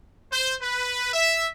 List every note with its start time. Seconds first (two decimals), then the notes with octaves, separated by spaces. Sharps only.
0.32 C5
0.61 B4
1.13 E5